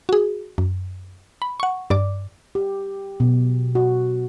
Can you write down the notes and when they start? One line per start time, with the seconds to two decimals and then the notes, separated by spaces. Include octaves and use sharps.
0.09 F#4 G#4
0.58 F#2
1.42 B5
1.60 F#5 C#6
1.90 G2 D5 D6
2.55 G4
3.20 B2
3.75 F#4